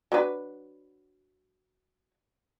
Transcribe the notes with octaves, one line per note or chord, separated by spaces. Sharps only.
F#3 D4 B4